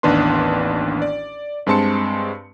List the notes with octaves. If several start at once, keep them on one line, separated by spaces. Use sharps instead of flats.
A1 D#2 B3 D4 B4 C6
D5
G2 G#3 C4 A5 C6 C#7